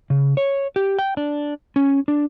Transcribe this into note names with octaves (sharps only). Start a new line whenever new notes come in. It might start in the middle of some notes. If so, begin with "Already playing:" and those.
C#3
C#5
G4
G5
D4
C#4
D4